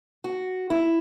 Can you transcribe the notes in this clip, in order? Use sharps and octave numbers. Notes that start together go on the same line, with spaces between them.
F#4
E4